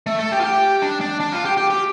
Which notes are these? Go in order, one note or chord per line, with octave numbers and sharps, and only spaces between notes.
A3
A4
G4
F4
G4
D4
D4
D4
F4
G4
G4
G4